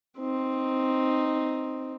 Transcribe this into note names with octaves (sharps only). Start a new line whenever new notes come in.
C4 D#4